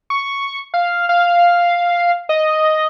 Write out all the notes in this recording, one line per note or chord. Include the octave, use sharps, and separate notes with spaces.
C#6
F5
F5
D#5